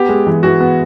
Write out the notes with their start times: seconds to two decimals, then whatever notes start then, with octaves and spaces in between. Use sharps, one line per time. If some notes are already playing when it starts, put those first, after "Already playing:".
Already playing: B3 G4
0.09 G#3
0.27 E3
0.43 E3 F#4
0.61 B3